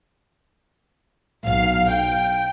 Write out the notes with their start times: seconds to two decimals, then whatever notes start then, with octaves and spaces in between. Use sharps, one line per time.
1.46 B1 F5
1.88 G5